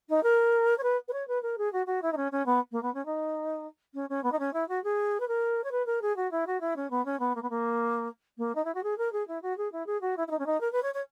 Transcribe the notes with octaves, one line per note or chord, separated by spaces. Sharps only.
D#4
A#4
C#5
B4
B4
C#5
B4
A#4
G#4
F#4
F#4
E4
D#4
C#4
C#4
B3
A#3
B3
C#4
D#4
C#4
C#4
B3
D#4
C#4
E4
F#4
G#4
B4
A#4
C#5
B4
A#4
G#4
F#4
E4
F#4
E4
C#4
B3
C#4
B3
A#3
B3
A#3
A#3
D#4
E4
F#4
G#4
A#4
G#4
E4
F#4
G#4
E4
G#4
F#4
E4
E4
D#4
C#4
D#4
A#4
B4
C#5
C#5